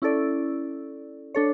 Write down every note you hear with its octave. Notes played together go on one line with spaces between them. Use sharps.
C#4 E4 A4 D5
D4 A4 C#5